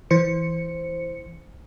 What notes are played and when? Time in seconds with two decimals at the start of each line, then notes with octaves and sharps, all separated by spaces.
0.11 E3 C5 C#7